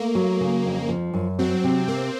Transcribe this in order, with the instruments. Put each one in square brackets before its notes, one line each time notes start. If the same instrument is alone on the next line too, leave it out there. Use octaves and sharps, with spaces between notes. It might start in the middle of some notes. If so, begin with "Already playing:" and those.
Already playing: [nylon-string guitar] A3 [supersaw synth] A#3
[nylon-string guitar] F#3
C#3
F2
F3
F#2
[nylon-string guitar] F#3 [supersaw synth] C4
[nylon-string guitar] C3
[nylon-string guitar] A#3 [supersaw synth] C4